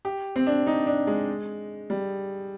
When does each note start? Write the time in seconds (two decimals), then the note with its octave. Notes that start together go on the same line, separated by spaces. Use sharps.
0.05 G4
0.36 C4
0.47 D4
0.67 D#4
0.87 D4
1.07 G#3
1.90 G3